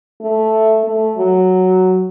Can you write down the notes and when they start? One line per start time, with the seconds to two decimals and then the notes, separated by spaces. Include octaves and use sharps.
0.21 A3
0.84 A3
1.17 F#3